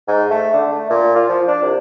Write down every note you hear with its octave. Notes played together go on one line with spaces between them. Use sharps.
G#2
A3
D3
A3
A#2
F4
F3
D4
C2